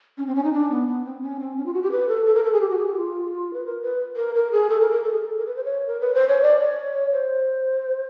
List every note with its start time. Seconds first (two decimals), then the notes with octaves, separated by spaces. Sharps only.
0.18 C#4
0.27 C4
0.35 C#4
0.44 D#4
0.53 D4
0.71 B3
0.88 B3
1.05 C4
1.22 C#4
1.40 C4
1.57 C#4
1.66 F4
1.74 F#4
1.83 G4
1.92 B4
2.08 A4
2.26 A4
2.35 A#4
2.44 A4
2.53 G#4
2.61 G4
2.70 F#4
2.78 G#4
2.87 G4
2.96 F4
3.53 B4
3.65 A#4
3.82 B4
4.16 A#4
4.35 A#4
4.52 G#4
4.69 A4
4.81 A#4
4.92 A#4
5.03 A4
5.12 G#4
5.21 A4
5.38 A#4
5.46 B4
5.56 C5
5.65 C#5
5.87 A#4
6.00 B4
6.14 C5
6.28 C#5
6.42 D5
6.60 C#5
7.12 C5